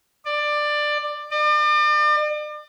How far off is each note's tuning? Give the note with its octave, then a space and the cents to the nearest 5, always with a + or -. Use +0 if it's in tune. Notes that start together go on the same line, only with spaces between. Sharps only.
D5 +15
D5 +40